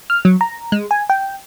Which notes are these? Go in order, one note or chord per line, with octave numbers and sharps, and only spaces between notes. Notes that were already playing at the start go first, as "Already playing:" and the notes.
F6
F#3
A#5
G#3
G#5
G5